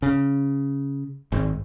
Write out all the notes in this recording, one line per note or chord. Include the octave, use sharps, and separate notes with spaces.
C#3
G#1